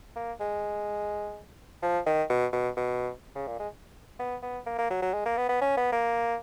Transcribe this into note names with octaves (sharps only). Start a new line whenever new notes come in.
A#3
G#3
F3
D#3
B2
B2
B2
C#3
A#2
G#3
B3
B3
A#3
A#3
F#3
F#3
G#3
A#3
B3
B3
C#4
B3
A#3